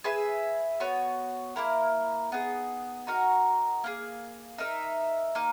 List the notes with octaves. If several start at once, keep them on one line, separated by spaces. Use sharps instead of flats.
G#4 B4 E5 G#5
B3 F#4 C#5
A#3 E4 A#4
B3 D#4 G#4
D#4 F#4 A#4
A#3 E4 G#4
D#4 A#4 E5
A#3 D#4